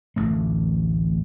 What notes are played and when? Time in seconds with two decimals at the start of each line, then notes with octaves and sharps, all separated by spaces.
0.16 D1 A1 A3